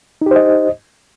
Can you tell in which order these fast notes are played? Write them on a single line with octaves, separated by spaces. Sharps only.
D#4 G4 C5 D#5